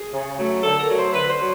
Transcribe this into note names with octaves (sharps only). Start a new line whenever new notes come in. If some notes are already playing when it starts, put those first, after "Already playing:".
Already playing: G#4
C#3
F#3 A3
D3 A4
A#4
F#3 A3
C5
D3 B4
C5
F#3